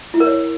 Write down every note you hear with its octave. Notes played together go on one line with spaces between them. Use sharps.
E4
A#4
C#5